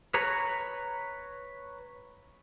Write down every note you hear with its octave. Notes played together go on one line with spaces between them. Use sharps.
B4 C#5 A#5